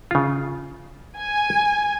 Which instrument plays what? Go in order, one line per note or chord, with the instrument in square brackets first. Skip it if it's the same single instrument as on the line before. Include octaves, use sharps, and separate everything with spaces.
[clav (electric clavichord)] C#3 F4
[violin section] G#5